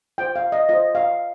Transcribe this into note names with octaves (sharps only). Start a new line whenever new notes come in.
F4 C5 G5
F5
D#5
F4 C5 D#5
F5